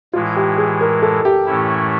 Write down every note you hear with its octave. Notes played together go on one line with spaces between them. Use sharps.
A2 E3 G#3 F4
G4
G#4
A#4
A4
G4
A2 E3 A3 C#4 E4